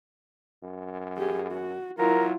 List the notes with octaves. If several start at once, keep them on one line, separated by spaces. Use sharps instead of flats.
F#2
G4 G#4
F#4
F#3 E4 F4 A#4